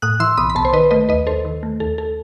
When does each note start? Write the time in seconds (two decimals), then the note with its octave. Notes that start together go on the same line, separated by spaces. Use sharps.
0.02 A2 D#6 F#6
0.20 E3 C6 E6
0.37 B1 B5 D#6
0.50 B5
0.55 B1 A5 C6
0.65 C5
0.73 D#3 B4 D#5
0.91 A3 B4 D#5
1.09 D#2 B4 D#5
1.27 D#2 A4 C5
1.45 D#3
1.63 A3
1.80 D#2 A4
1.98 A4